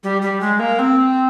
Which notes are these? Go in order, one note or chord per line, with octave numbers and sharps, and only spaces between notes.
G3
G3
G#3
A#3
C4